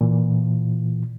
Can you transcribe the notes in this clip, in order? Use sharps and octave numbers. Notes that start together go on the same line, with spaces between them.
A#2 E3